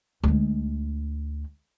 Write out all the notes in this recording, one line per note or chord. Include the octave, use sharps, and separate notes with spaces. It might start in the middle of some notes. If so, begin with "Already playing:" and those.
D2 G#3